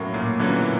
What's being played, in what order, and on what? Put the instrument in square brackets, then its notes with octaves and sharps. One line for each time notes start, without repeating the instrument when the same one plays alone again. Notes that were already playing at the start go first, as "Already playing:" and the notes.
Already playing: [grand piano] A2 [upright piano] F#3 A#3 C#4
[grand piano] A#2
[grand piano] D3 E3 [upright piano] F#3 A#3 C#4